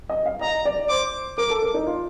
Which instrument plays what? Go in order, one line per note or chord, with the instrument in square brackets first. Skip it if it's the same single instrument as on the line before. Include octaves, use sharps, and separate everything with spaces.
[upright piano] D#5
F5
[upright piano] D#5 [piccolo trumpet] A#5
[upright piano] D5
[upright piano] C5 [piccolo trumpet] D6
[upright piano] A#4 [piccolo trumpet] D6
[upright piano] A4
A#4
D#4
F4